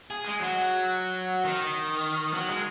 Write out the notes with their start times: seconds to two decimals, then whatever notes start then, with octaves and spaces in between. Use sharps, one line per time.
0.11 G#4
0.25 G#3
0.40 F#3
1.45 D#3
2.34 F#3
2.49 G#3